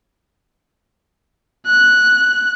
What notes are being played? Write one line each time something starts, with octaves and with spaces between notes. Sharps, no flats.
F#6